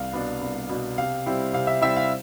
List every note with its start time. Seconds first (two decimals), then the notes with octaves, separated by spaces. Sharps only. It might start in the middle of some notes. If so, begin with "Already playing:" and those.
Already playing: C2 F5
0.13 B2 B3 D4
0.41 C2
0.69 B2 B3 D4
0.98 C3 F5
1.26 G3 C4 E4
1.53 C3 F5
1.67 E5
1.82 G3 C4 E4 E5
1.96 F5